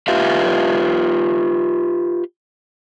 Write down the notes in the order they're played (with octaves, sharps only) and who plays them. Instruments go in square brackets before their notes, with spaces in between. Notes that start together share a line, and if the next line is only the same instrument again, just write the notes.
[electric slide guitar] F4 G4 B4 E5 F5